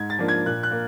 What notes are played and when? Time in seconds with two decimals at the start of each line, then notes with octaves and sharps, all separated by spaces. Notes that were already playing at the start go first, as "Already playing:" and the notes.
Already playing: G#2 G#6
0.10 A6
0.19 F3 A#3 D4
0.28 G#6
0.46 A#2 F#6
0.63 F#6
0.71 A#3